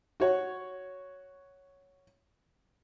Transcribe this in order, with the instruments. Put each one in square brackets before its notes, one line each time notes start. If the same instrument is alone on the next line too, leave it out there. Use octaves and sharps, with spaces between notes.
[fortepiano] F#4 C#5